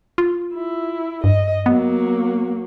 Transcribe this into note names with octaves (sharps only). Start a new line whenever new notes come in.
F4
E4
G2 D#5
F#3 A#3 B3